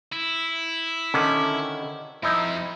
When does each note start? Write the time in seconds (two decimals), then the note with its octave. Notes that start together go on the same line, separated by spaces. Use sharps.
0.13 E4
1.14 D3 D#3 C#4
2.23 F2 F3 D#4 E4